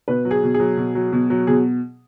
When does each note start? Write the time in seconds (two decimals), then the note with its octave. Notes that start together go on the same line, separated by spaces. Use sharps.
0.08 B2 B4
0.25 F#3
0.31 G#4
0.43 B2
0.54 G#4
0.60 F#3
0.77 B2
0.95 F#3
1.13 B2
1.30 F#3
1.47 B2 G#4